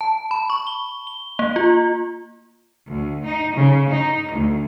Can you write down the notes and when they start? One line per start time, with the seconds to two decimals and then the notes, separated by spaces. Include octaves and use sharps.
0.01 A5
0.31 B5
0.50 C#6
0.67 G7
1.07 G7
1.39 A#3
1.56 F4
2.87 D2
3.24 D#4
3.56 C#3
3.90 D#4
4.30 D2